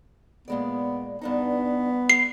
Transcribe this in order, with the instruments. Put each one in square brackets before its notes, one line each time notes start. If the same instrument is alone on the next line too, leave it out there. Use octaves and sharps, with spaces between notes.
[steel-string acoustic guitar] A#2 G#3 D5 [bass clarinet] B3
[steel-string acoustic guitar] G2 D4 D#4 [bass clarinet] B3
[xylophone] C7